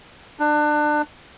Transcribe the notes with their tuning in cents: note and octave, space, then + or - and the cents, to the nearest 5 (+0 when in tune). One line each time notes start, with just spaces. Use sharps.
D4 +25